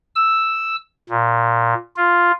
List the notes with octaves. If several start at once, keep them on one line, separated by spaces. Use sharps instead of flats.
E6
A#2
F4